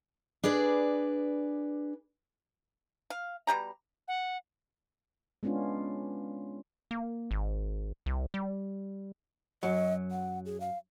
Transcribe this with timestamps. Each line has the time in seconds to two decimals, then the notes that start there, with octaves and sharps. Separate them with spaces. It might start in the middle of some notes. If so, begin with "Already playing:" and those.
0.44 D4 G#4 B4 D5
3.10 F5
3.47 B2 G3 G4 A#5
4.08 F#5
5.43 G#3 B3 C#4 D4 F4
6.91 A#3
7.31 G#1
8.06 C2
8.34 G3
9.63 F#2 F#3 D#5
10.11 F#5
10.46 G#4
10.60 F5